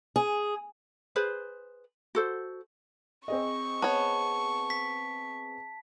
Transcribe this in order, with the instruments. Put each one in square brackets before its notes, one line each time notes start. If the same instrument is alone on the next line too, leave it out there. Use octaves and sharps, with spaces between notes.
[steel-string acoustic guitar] G#4
[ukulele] G#4 B4 C5
F#4 A4 C5
[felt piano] C4 G#4 D#5 [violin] C#6
[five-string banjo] B3 C#5 [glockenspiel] A5
[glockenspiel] B6